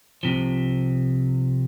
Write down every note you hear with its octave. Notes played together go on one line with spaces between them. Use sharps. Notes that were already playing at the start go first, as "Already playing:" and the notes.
C2 C3 F3